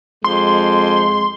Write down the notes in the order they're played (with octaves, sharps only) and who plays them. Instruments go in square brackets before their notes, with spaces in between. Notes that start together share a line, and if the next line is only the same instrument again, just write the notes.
[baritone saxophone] F2 [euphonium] G#3 [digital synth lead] C6